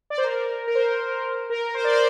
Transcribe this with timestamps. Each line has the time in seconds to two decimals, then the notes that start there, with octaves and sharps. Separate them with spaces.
0.10 D5
0.18 C5
0.24 A#4
0.68 A#4
0.75 C5
1.50 A#4
1.74 C5
1.84 D5
1.93 C5